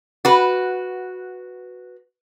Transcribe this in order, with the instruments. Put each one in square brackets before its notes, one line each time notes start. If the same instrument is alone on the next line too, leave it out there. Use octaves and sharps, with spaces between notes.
[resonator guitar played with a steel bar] F#4 B4